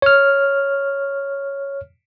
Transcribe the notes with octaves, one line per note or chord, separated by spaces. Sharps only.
C#5 F6